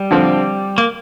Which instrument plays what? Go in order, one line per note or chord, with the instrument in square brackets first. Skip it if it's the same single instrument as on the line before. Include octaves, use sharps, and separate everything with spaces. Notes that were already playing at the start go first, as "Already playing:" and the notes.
Already playing: [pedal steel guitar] G3
[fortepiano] D3 F3 C4
[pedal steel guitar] A#3